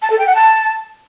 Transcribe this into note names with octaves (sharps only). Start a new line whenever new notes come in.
A5
A4
G5
F#5
A5